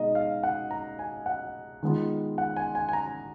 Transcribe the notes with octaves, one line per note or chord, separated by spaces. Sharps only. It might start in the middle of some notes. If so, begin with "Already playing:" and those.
Already playing: B2 G#3 B3 D#4 D#5
F5
F#5
A#5
G#5
F#5
D#3 G#3 B3 F4
F#5
G#5
G#5
G#5
A#5